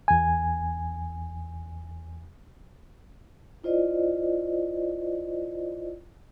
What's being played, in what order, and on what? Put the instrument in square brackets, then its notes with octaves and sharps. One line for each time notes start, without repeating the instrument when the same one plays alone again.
[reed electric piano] E2 G#5
[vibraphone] E4 F4 C5 D5 D#5